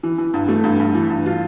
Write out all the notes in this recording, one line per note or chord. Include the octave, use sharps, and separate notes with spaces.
E3
E3
G2
A3
G2
G2
E3
G2
F4